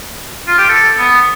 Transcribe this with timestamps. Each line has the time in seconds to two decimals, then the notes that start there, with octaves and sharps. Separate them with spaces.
0.48 F4
0.58 G4
0.69 A4
0.98 B3